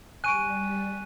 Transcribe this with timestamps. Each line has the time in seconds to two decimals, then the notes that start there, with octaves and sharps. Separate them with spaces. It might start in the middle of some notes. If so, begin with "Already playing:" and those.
0.24 G3 G#5 C#6 F#6 D7 D#7